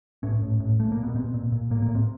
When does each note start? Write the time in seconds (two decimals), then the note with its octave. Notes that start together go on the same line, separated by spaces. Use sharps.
0.23 A2 C#4
0.42 A2
0.60 A2
0.79 A2 A3
0.92 A#2 A#3
1.03 B3
1.15 A#2 C4
1.34 A#2
1.52 A#2
1.70 A2 A#3
1.82 A#3
1.88 A2
1.95 C4